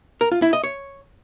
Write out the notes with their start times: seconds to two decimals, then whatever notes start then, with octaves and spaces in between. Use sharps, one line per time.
0.21 A#4
0.32 F4
0.42 E4
0.53 D#5
0.64 C#5